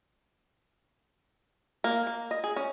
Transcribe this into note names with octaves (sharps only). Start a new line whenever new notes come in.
A#3
A#3
D#5
G#4
C#4